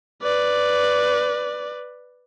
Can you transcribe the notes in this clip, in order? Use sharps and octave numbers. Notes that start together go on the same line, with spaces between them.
B4 D5